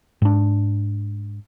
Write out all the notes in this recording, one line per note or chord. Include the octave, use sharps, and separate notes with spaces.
G#2 D4